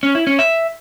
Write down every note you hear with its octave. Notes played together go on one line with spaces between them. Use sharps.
C#4
E4
C#4
E5